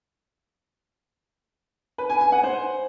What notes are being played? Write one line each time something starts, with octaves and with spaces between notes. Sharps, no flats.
B4
G#5
G#5
F#5
C5